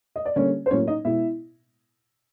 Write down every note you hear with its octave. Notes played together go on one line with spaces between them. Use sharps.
D#5
D5
D3 G3 A#3 C#4 C#5
C5
A2 F#3 A#3 C#4 C#5
D#4 D#5
B2 G#3 B3 E4 E5